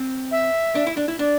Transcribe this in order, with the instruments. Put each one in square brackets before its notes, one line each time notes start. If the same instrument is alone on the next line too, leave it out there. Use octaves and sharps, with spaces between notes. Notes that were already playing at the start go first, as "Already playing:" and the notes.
Already playing: [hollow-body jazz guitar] C4
[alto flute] E5
[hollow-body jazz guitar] D4
E4
D4
E4
[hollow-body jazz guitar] D4 [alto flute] D5